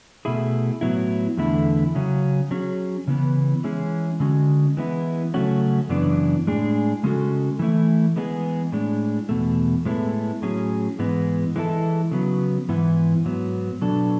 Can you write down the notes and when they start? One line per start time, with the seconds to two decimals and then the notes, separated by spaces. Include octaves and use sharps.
0.25 B2 A3 E4 G#4
0.81 A2 F#3 B3 E4
1.37 E2 D3 A3 E4
1.95 C#3 F#3 C#4
2.51 F#3 C#4 G#4
3.07 C#3 E3 B3
3.64 E3 G#3 C#4 E4 G#4
4.20 D3 G#3 C#4 F#4
4.77 E3 G#3 B3 E4
5.34 C#3 F#3 A3 C#4 F#4
5.89 F#2 C#3 E3 B3 D4
6.47 A2 G#3 D4 G#4
7.03 C#3 G#3 C#4 F#4 A4
7.59 E3 A3 E4
8.16 E3 G#3 B3 D4 G#4
8.72 A2 G#3 D4
9.29 E2 B2 A3
9.85 A2 G#3 B3 E4 A4
10.42 A2 F#3 C#4 G#4
10.99 G#2 E3 G#3 B3
11.56 E3 G#3 B3 E4 A4
12.11 C#3 F#3 B3
12.69 G#2 E3 B3 E4
13.25 G#2 F#3 B3
13.82 B2 F#3 B3 D4 A4